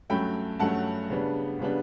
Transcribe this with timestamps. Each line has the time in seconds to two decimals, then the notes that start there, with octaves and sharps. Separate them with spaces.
0.10 G2 F#3 A3 C#4 G5 B5
0.59 G2 F#3 A3 C#4 F#5 A5
1.10 C#3 G3 B3 D4
1.59 C#3 G3 B3 D4